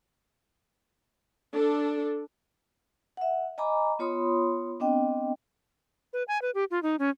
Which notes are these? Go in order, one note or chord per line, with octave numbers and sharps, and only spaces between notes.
D4 A4
E5 F#5
D#5 G#5 A#5 B5 D6
B3 F4 C#5 B5 C6 D#6
B3 C4 D4 D#5 G5
B4
G#5
B4
G4
F4
D#4
C#4